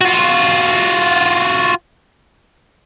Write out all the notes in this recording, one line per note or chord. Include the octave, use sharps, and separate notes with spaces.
F4 F#4